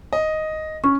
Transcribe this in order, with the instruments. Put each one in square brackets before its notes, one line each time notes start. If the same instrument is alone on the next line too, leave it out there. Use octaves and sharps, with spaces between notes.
[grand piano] D#5
[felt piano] C#4 [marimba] C#6